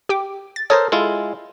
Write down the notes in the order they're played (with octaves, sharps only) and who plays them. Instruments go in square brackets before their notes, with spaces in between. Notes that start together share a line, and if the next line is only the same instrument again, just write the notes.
[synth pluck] G4 G5 D6
A6
[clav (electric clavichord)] A4 A#4 C5 [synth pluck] C#5 D#6
[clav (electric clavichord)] G#3 E4 F4 [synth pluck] A4